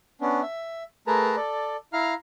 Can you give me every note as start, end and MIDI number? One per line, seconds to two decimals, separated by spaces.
0.21 0.41 59
0.21 0.41 61
0.21 0.41 62
0.42 0.83 76
1.07 1.36 57
1.07 1.36 68
1.07 1.36 70
1.07 1.36 71
1.07 1.36 81
1.07 1.36 82
1.37 1.77 69
1.37 1.77 74
1.93 2.14 64
1.93 2.14 77
1.93 2.14 82
1.93 2.14 89